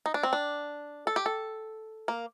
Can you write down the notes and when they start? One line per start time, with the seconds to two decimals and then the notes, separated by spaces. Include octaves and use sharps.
0.06 D#4
0.14 D4
0.23 C4
0.33 D4
1.07 A4
1.16 G4
1.26 A4
2.08 A#3